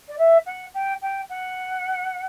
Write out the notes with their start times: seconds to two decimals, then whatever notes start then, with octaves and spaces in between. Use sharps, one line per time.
0.08 D5
0.18 E5
0.46 F#5
0.74 G5
1.02 G5
1.30 F#5